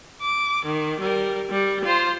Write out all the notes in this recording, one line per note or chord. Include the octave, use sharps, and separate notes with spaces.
D6
D#3
G3 A#4
G3
F4 C5